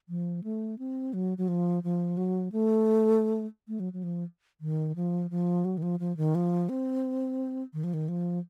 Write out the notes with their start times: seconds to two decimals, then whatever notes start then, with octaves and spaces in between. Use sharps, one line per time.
0.09 F3
0.44 A3
0.79 C4
1.13 F#3
1.38 F#3
1.48 F3
1.83 F3
2.17 F#3
2.52 A3
3.68 A3
3.80 F#3
3.93 F#3
4.03 F3
4.61 D#3
4.96 F3
5.30 F3
5.65 F#3
5.78 D#3
5.82 F3
6.00 F3
6.17 D#3
6.35 F3
6.69 C4
7.73 D#3
7.84 F3
7.94 D#3
8.08 F3